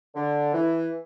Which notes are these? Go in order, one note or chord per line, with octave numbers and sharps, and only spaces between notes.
D3
E3